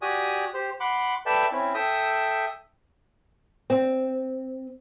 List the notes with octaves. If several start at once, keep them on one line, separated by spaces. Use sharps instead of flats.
F#4 G4 D5 G#5 D#6
G4 C5
F#5 B5 C6 D6
A4 B4 D5 E5 G5 A5
C4 C#4 E4
A4 E5 G5 D#6
C4